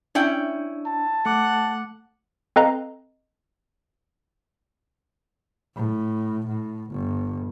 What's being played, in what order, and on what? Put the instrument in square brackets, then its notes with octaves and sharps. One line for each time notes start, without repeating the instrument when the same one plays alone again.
[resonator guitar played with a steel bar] C#4 E4 G5 [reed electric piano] D4
[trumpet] A5
[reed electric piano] A3 D6 [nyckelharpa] F#5
[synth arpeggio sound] C4 A4 B4 D#5 F5 A#5
[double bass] A2
A2
G1